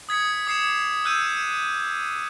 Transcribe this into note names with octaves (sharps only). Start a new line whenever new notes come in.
D#6 G#6 B6 C#7
D6 D#6 C7 C#7 E7
E6 F#6 G6 D#7